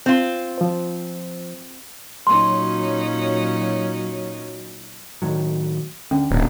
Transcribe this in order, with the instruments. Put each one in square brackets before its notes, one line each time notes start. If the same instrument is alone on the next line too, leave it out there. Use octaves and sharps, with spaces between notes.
[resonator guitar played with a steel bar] C4 F4
[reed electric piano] F3 C5
[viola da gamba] A#2 C#4 D#4 [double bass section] F#3 [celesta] C6
[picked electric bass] A2 D#3 F#3
[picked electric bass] D2 D3 [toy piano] C#4
[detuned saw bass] D1 [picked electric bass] B1 A#3 D4